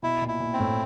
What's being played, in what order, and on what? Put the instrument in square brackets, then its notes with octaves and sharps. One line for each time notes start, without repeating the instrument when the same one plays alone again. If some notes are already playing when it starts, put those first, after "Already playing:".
[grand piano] B2 [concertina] E4
[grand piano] A#2
[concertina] E4
[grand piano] A#2
[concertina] C4
[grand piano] A2